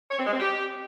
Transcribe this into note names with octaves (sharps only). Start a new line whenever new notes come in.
C#5
C4
G#3
C4
G4